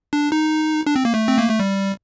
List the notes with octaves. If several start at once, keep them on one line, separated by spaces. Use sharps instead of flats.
D4
D#4
D4
C4
A#3
A3
C4
A#3
A3
G3